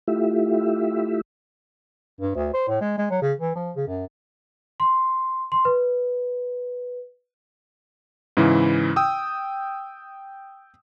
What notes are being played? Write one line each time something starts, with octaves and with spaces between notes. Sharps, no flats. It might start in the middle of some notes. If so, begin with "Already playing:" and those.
A3 E4 F4 G4 E5
G2
D2
C5
A2
G#3
G#3
F#3
C#3
E3
F3
C#3
F#2
C6
C6
B4
G#2 C#3 E3 E4
G5 D#6 E6